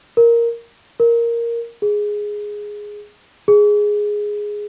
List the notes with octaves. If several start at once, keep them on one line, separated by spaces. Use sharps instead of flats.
A#4
A#4
G#4
G#4